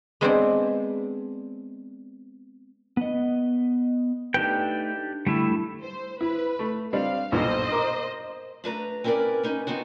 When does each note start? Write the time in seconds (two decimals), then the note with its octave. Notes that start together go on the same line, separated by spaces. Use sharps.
0.21 G#3 B3 C4 D4 C5 D5
2.97 B3 D#5
4.34 A3 D4 D#4 G4 B4 G5
5.27 D3 G3 A3 E4
5.82 C5
6.21 E4 B4
6.59 A3
6.93 G3 C4 D4 F5
7.32 B1 G2 A#2 C5 D#5
7.72 A#4 D6
8.64 A3 D4 B4 A#5
9.04 C4 C#4 E4 A#4 B4 D5
9.44 C#4 D#4 B4
9.67 B3 C4 D#4 F#4